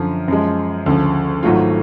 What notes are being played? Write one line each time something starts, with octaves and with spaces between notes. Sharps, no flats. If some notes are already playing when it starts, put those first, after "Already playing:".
Already playing: F#2 D3 F3
F#2 F3 G#3
D2 C#3 F3
G#1 G#2 F#3 A3 F4